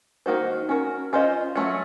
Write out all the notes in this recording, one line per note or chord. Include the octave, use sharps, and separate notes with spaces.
D#3 A#3 D#4 F#4 C5
C#4 F#4 A#4
C#4 F4 C5 D#5
F#3 A3 C#4